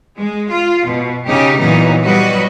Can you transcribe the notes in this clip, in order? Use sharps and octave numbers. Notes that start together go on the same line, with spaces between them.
G#3
F4
B2
C#3 D#4 G4
A#2 E3 F#3 B3 D#4
F#3 G3 F#4 B4 D#5